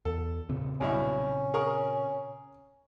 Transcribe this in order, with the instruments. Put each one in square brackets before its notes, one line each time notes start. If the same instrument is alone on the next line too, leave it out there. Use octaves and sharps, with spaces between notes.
[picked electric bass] E2 [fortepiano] A4
[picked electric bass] A#2 C#3 C4
[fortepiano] B1 G2 E4 [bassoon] C#4
[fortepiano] G#4 A#4 C#6